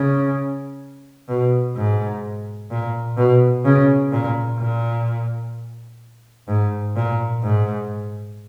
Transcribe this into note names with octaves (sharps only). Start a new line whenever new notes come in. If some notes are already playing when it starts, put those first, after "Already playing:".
Already playing: C#3
B2
G#2
A#2
B2
C#3
A#2
A#2
G#2
A#2
G#2